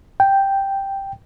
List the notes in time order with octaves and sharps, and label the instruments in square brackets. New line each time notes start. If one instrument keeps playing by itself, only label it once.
[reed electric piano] G5